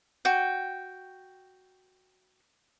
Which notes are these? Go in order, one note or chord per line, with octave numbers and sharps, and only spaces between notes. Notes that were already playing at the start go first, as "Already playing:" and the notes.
F#4 G5